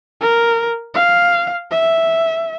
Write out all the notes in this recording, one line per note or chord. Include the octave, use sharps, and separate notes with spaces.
A#4
F5
E5